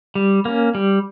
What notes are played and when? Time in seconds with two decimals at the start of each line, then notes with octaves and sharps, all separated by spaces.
0.15 G3
0.45 A#3 C#4
0.75 G3